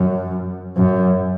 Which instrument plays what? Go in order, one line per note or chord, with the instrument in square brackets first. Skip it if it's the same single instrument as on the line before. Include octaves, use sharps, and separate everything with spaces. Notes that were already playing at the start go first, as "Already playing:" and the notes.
Already playing: [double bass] F#2
F#2